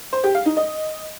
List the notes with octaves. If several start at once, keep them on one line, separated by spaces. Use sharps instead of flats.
C5
G4
F5
D#4
D#5